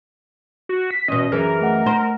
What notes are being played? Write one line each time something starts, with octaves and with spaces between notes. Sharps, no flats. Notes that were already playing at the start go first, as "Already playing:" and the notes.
F#4
B6
E2 B2 C#4 D#5
F#2 E3 G#4 A#4
A3 F#5
C5